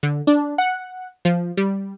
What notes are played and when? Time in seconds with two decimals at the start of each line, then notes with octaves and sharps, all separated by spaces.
0.03 D3
0.27 D4
0.58 F#5
1.25 F3
1.57 G3